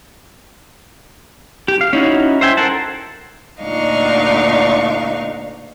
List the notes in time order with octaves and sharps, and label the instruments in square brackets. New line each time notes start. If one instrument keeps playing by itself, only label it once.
[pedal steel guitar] G4
F5
C#4 D#4 E4 F#4
C5 E5 G5 G#5
A4 A#4 C5 F#5 A5
[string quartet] D2 A#2 D4 D#4 F5 C#6